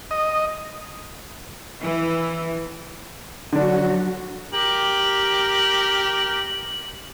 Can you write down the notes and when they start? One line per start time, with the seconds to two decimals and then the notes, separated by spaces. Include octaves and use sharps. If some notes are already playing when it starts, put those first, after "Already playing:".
0.11 D#5
1.81 E3
3.53 D3 F#3 D4 F#4
4.53 G4 A#4 F#7